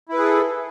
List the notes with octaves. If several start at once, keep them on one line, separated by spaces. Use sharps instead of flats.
E4 G#4 A4 B4